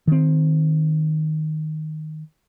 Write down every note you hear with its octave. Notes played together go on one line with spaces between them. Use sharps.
D#3 C4